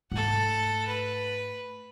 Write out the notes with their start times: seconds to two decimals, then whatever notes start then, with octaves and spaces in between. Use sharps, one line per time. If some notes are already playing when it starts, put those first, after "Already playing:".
0.12 G#2 A3 A4 F#5
0.88 B4